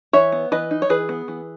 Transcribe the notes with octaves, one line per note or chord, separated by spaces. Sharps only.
E3 C#5 E5
B3
E3 B4 D#5
D#4
C#5
E3 G#4 B4
B3
E3